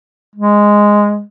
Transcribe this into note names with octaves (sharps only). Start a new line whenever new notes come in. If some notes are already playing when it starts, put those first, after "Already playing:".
G#3